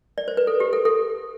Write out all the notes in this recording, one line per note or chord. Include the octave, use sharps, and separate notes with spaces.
D5
C5
B4
A4
G4
A4
A4